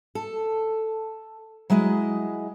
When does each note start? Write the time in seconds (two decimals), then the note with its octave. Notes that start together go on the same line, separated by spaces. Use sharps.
0.15 A4
1.70 F#3 G#3 E4 D#5